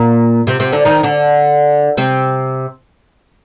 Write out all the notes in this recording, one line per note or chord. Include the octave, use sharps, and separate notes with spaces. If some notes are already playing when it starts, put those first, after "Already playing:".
Already playing: A#2 A#3
C3 C4
C3 C4
D3 D4
D#3 D#4
D3 D4
C3 C4